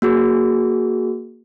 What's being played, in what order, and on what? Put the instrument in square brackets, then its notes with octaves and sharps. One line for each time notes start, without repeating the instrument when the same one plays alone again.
[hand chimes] A#3 F#4 G#4